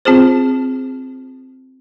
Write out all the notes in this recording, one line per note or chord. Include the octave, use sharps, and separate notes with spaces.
C4 F4 G#4 C5